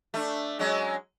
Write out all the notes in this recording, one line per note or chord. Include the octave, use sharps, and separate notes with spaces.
A3 D4
F#3 G#3 C#4